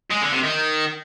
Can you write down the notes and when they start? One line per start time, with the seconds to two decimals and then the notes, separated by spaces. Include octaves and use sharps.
0.11 G#3
0.22 D3
0.33 C3
0.44 D#3